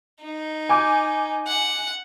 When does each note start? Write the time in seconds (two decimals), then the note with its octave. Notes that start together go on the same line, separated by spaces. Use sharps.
0.22 D#4
0.69 G#5 D6 G6
1.47 F#5